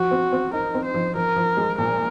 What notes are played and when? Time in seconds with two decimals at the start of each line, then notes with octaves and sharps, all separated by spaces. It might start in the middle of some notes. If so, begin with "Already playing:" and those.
Already playing: F3 F#4
0.11 C4
0.32 C4
0.53 D#4 A#4
0.74 C4
0.85 C5
0.94 F3
1.15 F3 A#4
1.36 F3
1.57 G#3
1.78 A#2 A#4